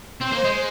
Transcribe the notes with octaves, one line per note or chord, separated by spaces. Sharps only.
C4 C5
A#3
G#3